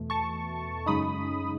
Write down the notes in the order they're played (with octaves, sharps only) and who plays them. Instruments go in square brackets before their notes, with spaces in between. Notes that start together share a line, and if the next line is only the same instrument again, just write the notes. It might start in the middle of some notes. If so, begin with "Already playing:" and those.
Already playing: [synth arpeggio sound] E2 B2 A3
A5 C#6
F#2 C#3 G#3 D#4 B5 D#6